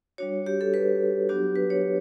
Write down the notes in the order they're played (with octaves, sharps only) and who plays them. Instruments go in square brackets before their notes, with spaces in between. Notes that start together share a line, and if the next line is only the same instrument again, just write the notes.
[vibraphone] G3 D4 F#4 C#5
G4
A4
B4
F#3 B3 D4 F#4 G4
B4
C#5